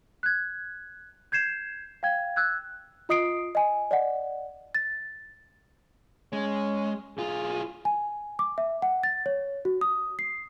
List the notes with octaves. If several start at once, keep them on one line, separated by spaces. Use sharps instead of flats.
F#6 G#6
G6 G#6 C7 E7
F5 G5 G#6
E6 F#6 G#6
F4 D#5 D#6 C7 D7
D#5 G#5
D5 D#5 F#5
A6
G#3 C#4
B1 F4 G#4
G#5
D6
E5
F#5
A6
C#5
F#4
D#6
C7